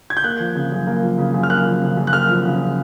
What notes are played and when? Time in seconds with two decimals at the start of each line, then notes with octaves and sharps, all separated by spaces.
0.10 G#6
0.17 G6
0.24 A#3 F#6
0.40 F3
0.55 C#3
0.72 F#2
0.87 A#3
1.03 F3
1.18 C#3
1.34 F#2
1.43 F6
1.50 A#3 F#6
1.66 F3
1.81 C#3
1.97 F#2
2.07 F#6
2.13 A#3 F6
2.29 F3
2.45 C#3